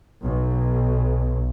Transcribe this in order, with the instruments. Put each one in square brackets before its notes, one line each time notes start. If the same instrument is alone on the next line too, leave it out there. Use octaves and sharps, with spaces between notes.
[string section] B1